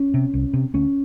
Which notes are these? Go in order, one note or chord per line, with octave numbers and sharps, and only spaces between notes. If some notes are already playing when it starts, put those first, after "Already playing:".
Already playing: C#4
C3
C2
C3
D2 C#4